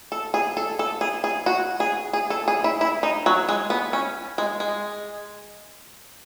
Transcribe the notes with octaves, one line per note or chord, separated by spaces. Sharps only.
A4
G#4
A4
A4
G#4
G#4
F#4
G#4
G#4
A4
G#4
E4
E4
D#4
F#3
G#3
B3
C#4
G#3
G#3